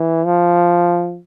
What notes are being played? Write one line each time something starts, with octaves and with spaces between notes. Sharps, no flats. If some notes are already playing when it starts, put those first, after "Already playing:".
Already playing: E3
F3